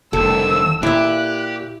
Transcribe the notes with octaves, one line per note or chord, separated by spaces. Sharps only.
F1 C2 D#3 A4 E6
A#2 E4 G4 E5 F#6